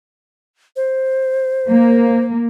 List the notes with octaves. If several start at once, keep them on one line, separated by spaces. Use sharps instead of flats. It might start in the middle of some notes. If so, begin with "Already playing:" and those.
C5
A#3